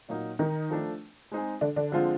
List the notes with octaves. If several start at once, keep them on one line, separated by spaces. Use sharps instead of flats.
A#2 F#3 A#3 D#4
D#3 D#4
F3 A3 D4
G#3 C4 D#4 G#4
D3 D4
D3 D4
D3 F3 G#3 C4 F4